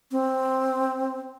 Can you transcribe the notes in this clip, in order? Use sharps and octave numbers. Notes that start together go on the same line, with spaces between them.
C4